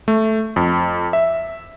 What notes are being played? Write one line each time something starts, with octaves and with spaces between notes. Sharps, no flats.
A3
F2
E5